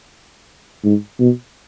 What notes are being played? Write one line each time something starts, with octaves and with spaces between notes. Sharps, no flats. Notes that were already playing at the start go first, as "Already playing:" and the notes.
G#2
B2